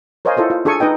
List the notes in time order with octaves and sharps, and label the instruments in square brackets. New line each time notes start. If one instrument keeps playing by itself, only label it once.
[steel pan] A#4 C5 C#5 D#5 F5 G#5
E4 F4 A4 C5 D#5
F4
D4 G#4 A4 G#5 C#6
D#4 B4 D#5 G5